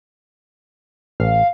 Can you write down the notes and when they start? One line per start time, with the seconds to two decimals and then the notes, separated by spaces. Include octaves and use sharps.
1.20 A1 F5